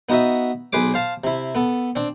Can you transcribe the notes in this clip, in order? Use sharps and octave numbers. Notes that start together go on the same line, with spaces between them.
B3 D#4 F#4 D#5 E5
B1 G#4 B4 C5 D6
C5 F5 A5
C3 E4
B3 A4
C4 D4